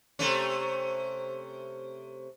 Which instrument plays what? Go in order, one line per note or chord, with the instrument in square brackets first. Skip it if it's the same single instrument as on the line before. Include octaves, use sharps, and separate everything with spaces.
[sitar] C3 A3 C#4